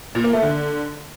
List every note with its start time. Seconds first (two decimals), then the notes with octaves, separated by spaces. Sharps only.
0.15 A#2
0.24 A#3
0.33 A3
0.42 D3